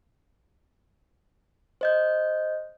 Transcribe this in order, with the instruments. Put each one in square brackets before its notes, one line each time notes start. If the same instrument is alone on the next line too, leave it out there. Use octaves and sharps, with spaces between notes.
[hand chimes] C5 D#5 G6